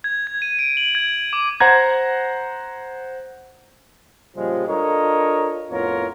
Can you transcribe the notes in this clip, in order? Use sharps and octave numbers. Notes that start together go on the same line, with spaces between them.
G#6
G#6
D#7
D7
F#7
G#6
D6
C5 F#5 A#5 G#6
A#2 C#3 F3 G3 G#3
D4 F4 A4 A#4 C#5 D#5
F2 A2 B3 F4 A#4 C#5